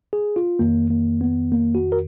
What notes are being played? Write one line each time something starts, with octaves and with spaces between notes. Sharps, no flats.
G#4
F4
F2 D#3 A#3
A#3
B3
A#3
F#4
A#4